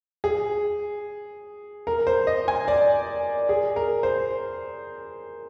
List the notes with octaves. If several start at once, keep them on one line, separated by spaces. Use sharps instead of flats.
G#4
A#4
C5
D#5
G#5
D5
G#4
A#4
C5